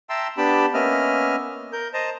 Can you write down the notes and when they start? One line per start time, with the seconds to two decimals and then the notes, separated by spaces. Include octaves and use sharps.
0.09 E5 G5 A5 A#5 C6 E6
0.37 B3 D4 G4 G5 A5 B5
0.74 A#3 B3 C#4 D#5 E5 F6
1.73 A#4 G6
1.94 C5 D#5 A5 A#5